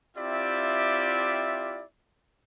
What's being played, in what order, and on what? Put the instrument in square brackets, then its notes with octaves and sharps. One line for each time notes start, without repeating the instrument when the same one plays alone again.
[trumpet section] C4 E4 F4 G4 D5 E5